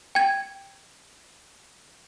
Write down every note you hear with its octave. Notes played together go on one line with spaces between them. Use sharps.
G5 G#6